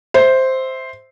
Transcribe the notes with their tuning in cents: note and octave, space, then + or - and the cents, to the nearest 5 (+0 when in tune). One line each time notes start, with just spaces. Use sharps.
C5 +0 E5 -10